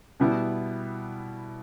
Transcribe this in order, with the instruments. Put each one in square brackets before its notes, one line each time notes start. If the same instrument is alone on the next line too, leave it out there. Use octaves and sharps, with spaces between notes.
[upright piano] B2 G3 B3 E4